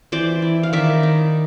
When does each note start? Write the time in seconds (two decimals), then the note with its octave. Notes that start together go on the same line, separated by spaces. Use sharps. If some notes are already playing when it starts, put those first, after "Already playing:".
0.12 E3 C5 D5
0.42 E4
0.63 F5
0.73 D#3 D5 E5
1.03 D#4